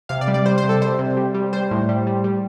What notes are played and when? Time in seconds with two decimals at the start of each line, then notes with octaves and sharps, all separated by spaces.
0.09 C3 F5
0.21 D5
0.28 G3
0.34 D5
0.46 G3 C5
0.58 C5
0.63 C3
0.69 A4
0.82 G3 C5
0.99 C3
1.17 G3
1.34 G3
1.53 G3 C5
1.71 A2
1.89 G3
2.07 G3
2.24 G3